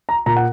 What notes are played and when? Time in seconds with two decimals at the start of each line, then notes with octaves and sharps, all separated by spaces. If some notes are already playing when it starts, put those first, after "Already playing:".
0.09 A#5
0.26 A#2 A#5
0.36 F#5